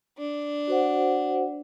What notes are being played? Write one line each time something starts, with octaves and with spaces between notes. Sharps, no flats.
D4
F#4 C5 F#5